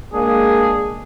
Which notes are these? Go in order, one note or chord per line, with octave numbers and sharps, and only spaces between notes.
G#3 A#3 D4 G#4